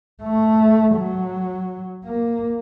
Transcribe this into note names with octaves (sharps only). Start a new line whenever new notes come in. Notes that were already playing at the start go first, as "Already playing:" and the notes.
A3
F#3
A#3